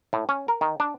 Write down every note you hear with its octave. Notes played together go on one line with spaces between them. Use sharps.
A2
C#4
A#4
D#3
D4